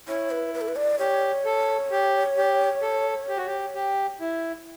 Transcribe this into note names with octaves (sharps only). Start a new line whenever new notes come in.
E4 C#5
B4
B4
A4
B4
D5
G4 C#5
A4
G4
G4
A4
G4
F#4
G4
G4
E4